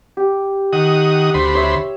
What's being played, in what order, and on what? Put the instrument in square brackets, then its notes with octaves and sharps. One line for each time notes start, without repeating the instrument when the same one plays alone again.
[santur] G4
[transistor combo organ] D#3 F#5 D#6
D2 C5 B5
[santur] C#5 E5